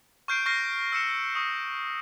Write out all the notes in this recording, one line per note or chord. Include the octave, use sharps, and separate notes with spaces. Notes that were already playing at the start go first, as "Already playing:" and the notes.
C#6 F6 G6 C7 D7
C#6 F6 A#6 C7
E6 F6 C#7 E7
C#6 D#6